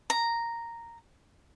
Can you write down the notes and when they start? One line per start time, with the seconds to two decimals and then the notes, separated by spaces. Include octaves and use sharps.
0.10 A#5